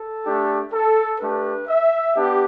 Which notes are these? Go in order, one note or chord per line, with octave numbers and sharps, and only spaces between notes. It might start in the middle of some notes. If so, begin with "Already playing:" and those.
Already playing: A4
A3 D4 G4
A4
A3 D4 G4 B4
E5
B3 D4 G4